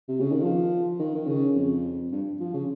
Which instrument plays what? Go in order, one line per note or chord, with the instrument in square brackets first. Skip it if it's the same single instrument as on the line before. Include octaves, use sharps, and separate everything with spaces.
[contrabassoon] C3
C#3
D#3
F3
D#3
D#3
C#3
F2
G2
F3
C#3